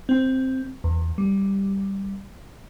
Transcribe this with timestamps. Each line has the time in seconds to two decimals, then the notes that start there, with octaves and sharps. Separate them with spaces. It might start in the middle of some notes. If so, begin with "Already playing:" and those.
0.09 C4
0.84 E2
1.18 G3